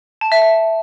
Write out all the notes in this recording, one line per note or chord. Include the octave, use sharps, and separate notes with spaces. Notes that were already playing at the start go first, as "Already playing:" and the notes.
A5
E5
E5